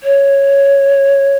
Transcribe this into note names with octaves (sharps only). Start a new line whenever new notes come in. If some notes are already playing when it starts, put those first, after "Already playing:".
C#5